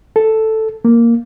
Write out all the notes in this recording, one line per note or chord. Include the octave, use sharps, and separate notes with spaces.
A4
A#3